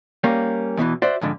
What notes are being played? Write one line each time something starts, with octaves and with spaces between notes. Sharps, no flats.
G3 A#3 C#4
E2 B2 D#3 E3
F#4 C5 D5 E5
F2 G#2 D3